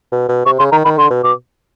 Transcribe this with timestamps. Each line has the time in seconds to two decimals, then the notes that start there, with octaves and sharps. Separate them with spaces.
0.12 B2
0.28 B2
0.46 C3 C#6
0.59 C#3 C6
0.72 D#3 A#5
0.84 D#3 B5
0.97 D3 C6
1.10 B2
1.24 B2 D6